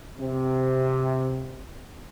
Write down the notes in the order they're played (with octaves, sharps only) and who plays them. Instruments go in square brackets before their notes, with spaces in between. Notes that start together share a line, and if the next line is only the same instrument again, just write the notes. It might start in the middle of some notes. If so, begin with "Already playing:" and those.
[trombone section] C3